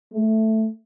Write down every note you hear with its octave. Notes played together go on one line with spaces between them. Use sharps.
A3